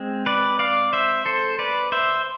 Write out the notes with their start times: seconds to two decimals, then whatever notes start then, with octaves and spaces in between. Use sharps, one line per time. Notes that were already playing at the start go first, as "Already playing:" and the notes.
Already playing: G#3 C4
0.26 B4 D5
0.59 D5 F5
0.93 C5 E5
1.26 A4 C5
1.59 B4 D5
1.92 C5 E5